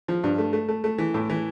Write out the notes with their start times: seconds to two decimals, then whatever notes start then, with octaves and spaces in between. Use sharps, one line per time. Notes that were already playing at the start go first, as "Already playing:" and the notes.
0.08 F3
0.24 G2
0.38 A3
0.53 A3
0.69 A3
0.84 A3
0.98 E3
1.14 A2
1.30 E3